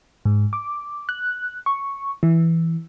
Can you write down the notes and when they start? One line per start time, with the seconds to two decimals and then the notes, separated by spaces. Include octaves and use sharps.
0.25 G#2
0.53 D6
1.09 F#6
1.66 C#6
2.23 E3